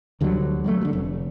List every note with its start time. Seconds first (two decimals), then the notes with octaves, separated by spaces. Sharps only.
0.21 D2 D3 F#3 G3
0.64 F#3 G3 A3
0.81 D3 F#3
0.93 F1